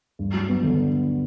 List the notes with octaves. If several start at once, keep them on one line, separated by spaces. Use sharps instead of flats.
G2
F#3
B3
D3